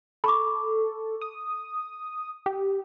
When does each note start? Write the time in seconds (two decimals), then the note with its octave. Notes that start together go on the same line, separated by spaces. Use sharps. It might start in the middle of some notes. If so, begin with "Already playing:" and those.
0.24 A4 B5 C#6 D6
1.21 D#6
2.46 G4